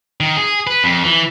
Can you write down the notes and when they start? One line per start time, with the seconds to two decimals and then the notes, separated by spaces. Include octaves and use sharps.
0.20 D#3
0.37 G#4
0.67 B4
0.84 F2
1.04 E3